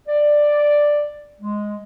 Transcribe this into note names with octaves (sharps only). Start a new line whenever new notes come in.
D5
G#3